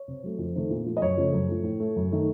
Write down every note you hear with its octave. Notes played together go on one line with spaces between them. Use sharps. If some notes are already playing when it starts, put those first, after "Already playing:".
Already playing: C#5
C3
F#3 A3
F2
C3 D#3 A3
A#2
F3 A3
D#5
F#2 C#5
C#3 F3 A3
F#2
F3 A3
A2
A3
F#2
D#3 A3